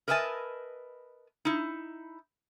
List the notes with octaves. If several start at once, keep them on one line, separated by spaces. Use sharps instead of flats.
A#4 B4 D#5 E5 G#5 A5
D#4 E4